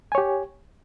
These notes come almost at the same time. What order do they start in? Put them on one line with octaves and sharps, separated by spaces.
G#5 C#5 G4